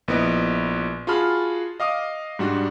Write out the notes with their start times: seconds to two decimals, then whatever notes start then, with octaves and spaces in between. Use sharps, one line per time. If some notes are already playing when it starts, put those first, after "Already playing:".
0.08 A#1 B3 E4 B4 D#5 D7
1.07 F4 F#4 G#4 A5 B5 F6
1.80 D#5 F5 D6 D#6
2.39 G#2 G3 D4 F#4